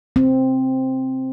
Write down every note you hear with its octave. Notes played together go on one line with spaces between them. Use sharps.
C4